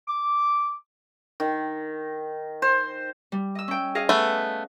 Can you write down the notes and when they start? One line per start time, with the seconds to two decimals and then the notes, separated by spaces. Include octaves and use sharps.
0.08 D6
1.40 D#3
2.62 C5
3.32 G3
3.55 D#5 E6
3.68 C#4 G5
3.95 G#4 D#5 F5
4.09 A3 B3